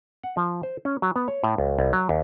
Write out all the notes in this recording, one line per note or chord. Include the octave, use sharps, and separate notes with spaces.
F#5
F3
C5
C#4
F#3
B3
C#5
A2
C#2
C2
F#3
D#2